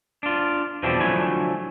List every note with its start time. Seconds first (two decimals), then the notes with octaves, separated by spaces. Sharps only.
0.23 D4 F4
0.83 E2 B2 F3 C4 D4 E4
1.01 D3 F3 F#3 A3 E4 G#5